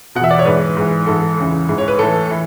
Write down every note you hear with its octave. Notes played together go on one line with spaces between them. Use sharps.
E2 B2 E5 F#5
D5
C#5
G#2 E3 B4
G#2 E3
G#2 E3 A4
E2 C#3 E3
G#2 E3
C#5
B4
A2 E3 A4
E3